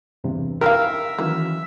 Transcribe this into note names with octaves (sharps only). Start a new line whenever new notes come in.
E2 G2 C3
D#3 E3 A#4 E5 F5 G5
D#3 E3 F#3 A#3 C#4